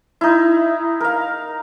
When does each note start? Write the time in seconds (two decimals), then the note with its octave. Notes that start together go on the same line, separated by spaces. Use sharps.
0.21 D#4 E4
1.00 A#4 F5